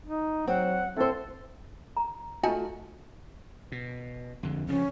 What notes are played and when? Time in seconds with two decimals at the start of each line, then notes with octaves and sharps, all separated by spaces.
0.06 D#4
0.47 F#3 C4 F#5
0.96 C4 E4 A4 C5
1.97 A#5
2.43 A3 D#4 F4 F#4 G#5 A5
3.72 B2
4.43 F2 D3
4.69 C#3 F3 C#4